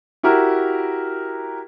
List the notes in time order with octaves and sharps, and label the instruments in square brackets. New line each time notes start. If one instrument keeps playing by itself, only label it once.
[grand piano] E4 F#4 G4 A#4